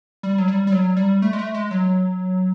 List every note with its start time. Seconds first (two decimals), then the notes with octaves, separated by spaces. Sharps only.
0.23 G3
0.38 F#3
0.48 G3
0.67 G3
0.72 F#3
0.97 G3
1.22 A3
1.33 G#3
1.39 A3
1.54 G#3
1.71 F#3